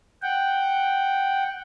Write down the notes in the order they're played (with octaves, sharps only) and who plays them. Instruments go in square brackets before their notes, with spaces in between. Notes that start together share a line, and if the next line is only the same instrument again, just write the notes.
[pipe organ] F#5 G5